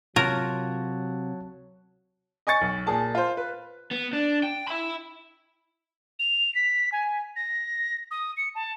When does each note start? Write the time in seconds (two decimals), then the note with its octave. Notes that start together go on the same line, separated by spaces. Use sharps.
0.16 C3 F#3 F4 A#4 C#5 A5 F#6
2.47 D#5 G#5 C#6 A6 C#7
2.61 B1
2.87 A#2 G#4 A5
3.15 F4 C5
3.37 B4
3.91 B3
4.13 D4
4.43 G5
4.68 E5 B5
6.19 F7
6.55 B6
6.92 G#5
7.36 A#6
8.11 D#6
8.37 C#7
8.55 A5